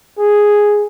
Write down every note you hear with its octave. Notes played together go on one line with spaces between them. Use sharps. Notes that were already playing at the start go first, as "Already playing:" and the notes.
G#4